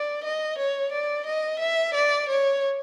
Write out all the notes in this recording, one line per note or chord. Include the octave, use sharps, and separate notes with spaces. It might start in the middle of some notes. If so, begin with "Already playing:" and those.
Already playing: D5
D#5
C#5
D5
D#5
E5
D5
C#5